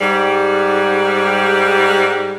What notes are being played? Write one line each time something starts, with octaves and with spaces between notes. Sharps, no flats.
G#2 G3